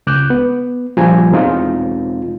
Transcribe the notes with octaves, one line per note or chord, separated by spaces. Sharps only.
C#2 D6 F#6 G6
B3
A#2 F3 G3 G#5 A#5
E2 B2 G#3 C4 D#4 F4